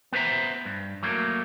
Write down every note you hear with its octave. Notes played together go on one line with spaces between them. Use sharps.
B3 B4 C5 E5 A#5
G2
F#3 A3 A#3